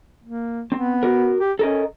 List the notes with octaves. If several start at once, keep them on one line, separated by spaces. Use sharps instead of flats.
A#3
B3 C4
F#4 A#4
G4
C#4 A4 A#4 D#5